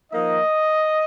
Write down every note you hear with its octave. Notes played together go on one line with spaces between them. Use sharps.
F3 A#3 D#4 D#5